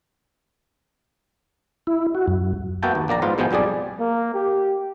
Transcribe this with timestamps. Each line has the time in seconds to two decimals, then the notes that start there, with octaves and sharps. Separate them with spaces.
1.87 E4
2.15 F#4
2.28 F#2
2.83 A#3 B3 F#4 E5 G5 A5
2.95 D#2
3.08 A#1 A#3 D5 A#5
3.22 G#2 B3 F4
3.38 G#2 B2 F3 B3 G5 G#5
3.51 B1 F2 G3 G#4 D5
3.99 A#3
4.34 G4